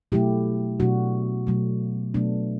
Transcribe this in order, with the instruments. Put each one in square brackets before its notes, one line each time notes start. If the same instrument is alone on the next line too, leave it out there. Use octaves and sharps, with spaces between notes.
[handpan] B2 F#3 A3 E4 G4
B2 F#3 A3 D4 F#4
B2 F#3 A3
B2 F#3 A3 B3 D4